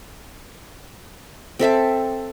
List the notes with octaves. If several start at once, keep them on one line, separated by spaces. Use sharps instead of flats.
C4 A4 E5 A5